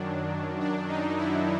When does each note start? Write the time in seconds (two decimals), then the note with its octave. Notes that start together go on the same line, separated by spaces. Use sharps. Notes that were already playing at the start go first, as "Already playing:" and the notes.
Already playing: F#2 D#3 F#3 D4
0.60 D4
0.88 D#4
1.16 E4